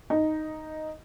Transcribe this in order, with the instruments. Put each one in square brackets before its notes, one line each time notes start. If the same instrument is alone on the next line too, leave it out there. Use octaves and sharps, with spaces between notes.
[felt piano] D#4